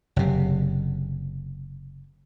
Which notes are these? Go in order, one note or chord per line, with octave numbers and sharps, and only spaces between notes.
F#1 C3